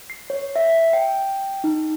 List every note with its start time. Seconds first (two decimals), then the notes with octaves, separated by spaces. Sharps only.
0.10 C7
0.30 C#5
0.56 E5
0.93 G5
1.64 D#4